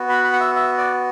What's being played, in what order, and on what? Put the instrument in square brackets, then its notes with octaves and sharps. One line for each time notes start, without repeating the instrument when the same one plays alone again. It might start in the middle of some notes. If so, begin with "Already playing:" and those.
Already playing: [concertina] B3 F#4
B5
B5
F#5
E5
E5
D5